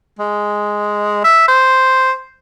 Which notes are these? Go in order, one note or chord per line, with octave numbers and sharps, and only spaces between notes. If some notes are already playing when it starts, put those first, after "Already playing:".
G#3
E5
C5